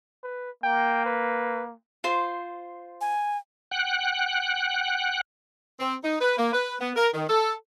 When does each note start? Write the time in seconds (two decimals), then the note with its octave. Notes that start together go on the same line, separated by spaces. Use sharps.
0.23 B4
0.64 A#3 G5
1.06 B4
2.04 F4 C5
3.01 G#5
3.71 F#5 G5 F#6
5.80 C4
6.04 D#4
6.21 B4
6.38 A#3
6.53 B4
6.80 B3
6.96 A#4
7.14 D#3
7.28 A4